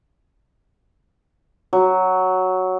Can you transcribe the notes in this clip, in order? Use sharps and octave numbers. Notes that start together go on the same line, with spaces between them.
F#3